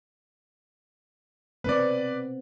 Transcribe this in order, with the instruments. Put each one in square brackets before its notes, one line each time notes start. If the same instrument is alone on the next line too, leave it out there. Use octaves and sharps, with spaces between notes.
[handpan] B3 C4 [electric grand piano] B4 D5